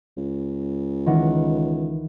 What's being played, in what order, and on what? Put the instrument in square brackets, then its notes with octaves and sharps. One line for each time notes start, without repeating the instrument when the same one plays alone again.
[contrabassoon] C#2
[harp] D#3 E3 F#5